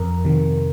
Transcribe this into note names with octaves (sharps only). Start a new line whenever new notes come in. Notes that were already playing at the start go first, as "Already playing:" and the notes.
Already playing: F2 A#4
C3 D#3